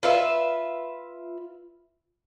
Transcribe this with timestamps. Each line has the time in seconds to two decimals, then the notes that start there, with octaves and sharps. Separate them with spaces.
0.03 F4 B4 E5